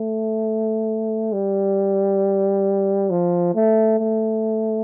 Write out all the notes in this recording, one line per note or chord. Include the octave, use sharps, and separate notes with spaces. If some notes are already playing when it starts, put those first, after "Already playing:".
Already playing: A3
G3
F3
A3
A3